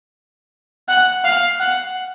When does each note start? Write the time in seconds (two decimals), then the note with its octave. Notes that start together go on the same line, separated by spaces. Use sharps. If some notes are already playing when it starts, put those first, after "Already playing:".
0.89 F#5
1.24 F5
1.60 F#5